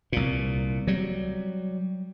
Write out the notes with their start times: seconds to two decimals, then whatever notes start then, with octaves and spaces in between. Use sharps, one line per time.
0.12 C2 A#2
0.87 F#3 G3